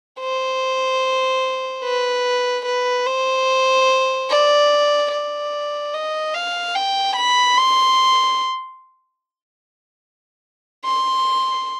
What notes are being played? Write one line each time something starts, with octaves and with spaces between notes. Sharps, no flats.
C5
B4
B4
C5
D5
D5
D#5
F5
G5
B5
C6
C6